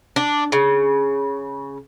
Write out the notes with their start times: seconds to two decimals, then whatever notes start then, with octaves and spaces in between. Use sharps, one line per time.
0.16 D4
0.52 C#3